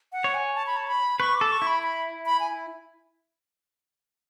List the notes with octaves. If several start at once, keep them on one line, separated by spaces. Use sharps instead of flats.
F#5
C#5
G#5
A5
B5
A5
B5
B4 C#6
D6
A4
C#6
E4
B5
B5
B5
G#5